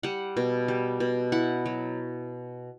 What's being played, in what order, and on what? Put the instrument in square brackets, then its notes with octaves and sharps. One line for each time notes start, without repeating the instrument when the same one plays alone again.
[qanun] G3 F#5
B2
G3
B2
E4 F#5
F#3